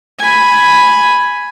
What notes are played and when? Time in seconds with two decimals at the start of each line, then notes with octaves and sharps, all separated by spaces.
0.19 G#5 B5